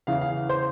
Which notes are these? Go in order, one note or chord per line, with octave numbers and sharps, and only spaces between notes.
E2 C#3 E3 F5
F5
C5